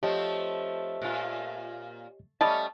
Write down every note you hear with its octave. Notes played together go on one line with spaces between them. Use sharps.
F3 A3 C4 G4 C#5 D#5
A#2 F4
G3 A3 C#4 D#5 A5